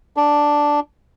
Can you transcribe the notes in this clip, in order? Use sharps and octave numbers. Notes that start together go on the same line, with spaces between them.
D4